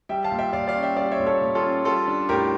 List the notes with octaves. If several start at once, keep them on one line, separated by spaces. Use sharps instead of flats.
G3 E5 G5
F5 A5
A#2
E5 G5
A#2 D5 F5
D5 F5
C#4
E5 G5
G3 D5 F5
C#5 E5
A#2
A4 C#5
A#2
F4 A4
C#4
G3 F4 A4
D4
A2 G4 A#4